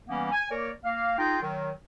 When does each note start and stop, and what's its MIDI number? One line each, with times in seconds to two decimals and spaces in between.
0.09 0.30 52
0.09 0.30 55
0.09 0.30 58
0.09 0.30 59
0.09 0.30 61
0.32 0.45 80
0.51 0.71 58
0.51 0.71 70
0.51 0.71 73
0.51 0.71 74
0.85 1.17 58
0.85 1.17 77
1.18 1.38 63
1.18 1.38 65
1.18 1.38 68
1.18 1.38 79
1.42 1.70 51
1.42 1.70 54